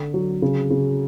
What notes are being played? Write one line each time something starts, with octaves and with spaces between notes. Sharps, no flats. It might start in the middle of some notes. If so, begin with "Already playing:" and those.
Already playing: D3
F#3
C#3
C#3